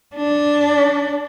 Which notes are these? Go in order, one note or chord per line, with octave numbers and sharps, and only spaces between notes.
D4